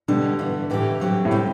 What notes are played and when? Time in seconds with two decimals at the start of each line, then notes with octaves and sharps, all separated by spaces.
0.08 B2 D3 G3 B3
0.39 G2 E3 B3
0.70 A2 E3 A3 E4 G4
1.00 G2 F#3 C4 G4
1.25 A2
1.31 C3 G3 C4